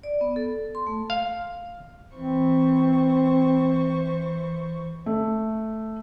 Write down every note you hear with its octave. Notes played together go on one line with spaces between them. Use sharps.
D5
B3
A4
C6
A3
F5
E3 C4 C5 C#6
A3